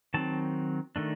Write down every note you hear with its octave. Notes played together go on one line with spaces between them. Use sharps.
D#3 F#3 C4 A5
D#3 A3 D4